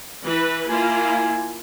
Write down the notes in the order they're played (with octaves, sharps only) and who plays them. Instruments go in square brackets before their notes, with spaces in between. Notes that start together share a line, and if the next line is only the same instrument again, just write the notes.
[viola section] E3 B4
[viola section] A#3 E4 F4 [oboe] G#5